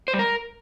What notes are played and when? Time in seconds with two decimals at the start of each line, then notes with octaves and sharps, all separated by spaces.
0.08 C5
0.14 G3
0.19 A#4